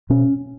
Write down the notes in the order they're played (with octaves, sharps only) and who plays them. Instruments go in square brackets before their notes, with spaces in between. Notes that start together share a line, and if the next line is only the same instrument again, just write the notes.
[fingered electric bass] B2 C#4